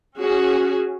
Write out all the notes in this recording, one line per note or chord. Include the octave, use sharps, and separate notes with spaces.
C#4 F#4 G#4